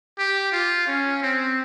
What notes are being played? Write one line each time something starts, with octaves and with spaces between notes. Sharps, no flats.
G4
F4
C#4
C4